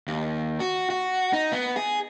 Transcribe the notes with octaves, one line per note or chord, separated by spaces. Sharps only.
D#2
F#4
F#4
D#4
B3
G#4